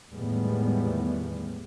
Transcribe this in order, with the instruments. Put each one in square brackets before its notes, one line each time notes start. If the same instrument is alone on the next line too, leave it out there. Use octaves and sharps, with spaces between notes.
[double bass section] E2 A2 D#3 G3 G#3 B3